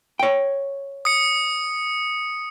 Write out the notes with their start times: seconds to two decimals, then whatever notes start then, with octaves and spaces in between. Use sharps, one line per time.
0.19 C#5 G5
1.05 D#6 C#7